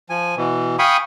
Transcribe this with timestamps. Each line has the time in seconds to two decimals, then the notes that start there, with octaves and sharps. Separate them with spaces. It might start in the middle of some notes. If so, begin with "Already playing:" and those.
0.10 F3 G#5
0.37 B2 E3
0.79 F5 G5 G#5 B5 C#6 D#6